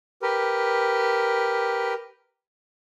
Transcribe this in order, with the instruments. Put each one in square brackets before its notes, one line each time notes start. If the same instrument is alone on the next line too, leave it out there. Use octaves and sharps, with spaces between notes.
[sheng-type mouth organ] G4 A#4 B4